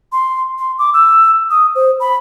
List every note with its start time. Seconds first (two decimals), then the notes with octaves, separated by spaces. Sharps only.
0.12 C6
0.58 C6
0.79 D6
0.94 E6
1.51 D#6
1.75 C5
2.00 B5